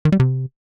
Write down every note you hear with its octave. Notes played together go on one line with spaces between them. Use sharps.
D#3
G3
C3